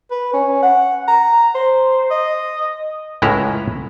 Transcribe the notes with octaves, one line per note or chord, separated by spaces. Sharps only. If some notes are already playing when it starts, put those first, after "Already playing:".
B4
C#4
F#5
A#5
C5
D#5
C#2 A2 G#3 C#4 E4 A#5